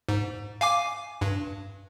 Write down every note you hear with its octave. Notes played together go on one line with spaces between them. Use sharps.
G#2
F5 G#5 D6
G2